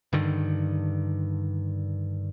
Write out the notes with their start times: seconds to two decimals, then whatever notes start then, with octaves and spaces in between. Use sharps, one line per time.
0.13 G2 D3 D#3